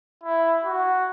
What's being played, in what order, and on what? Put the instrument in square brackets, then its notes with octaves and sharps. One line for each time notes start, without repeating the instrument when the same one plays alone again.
[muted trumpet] E4
F#4